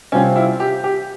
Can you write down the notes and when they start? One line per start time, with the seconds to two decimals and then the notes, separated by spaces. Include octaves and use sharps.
0.12 C3 G3 C4 C#4 F4
0.36 E4
0.60 G4
0.84 G4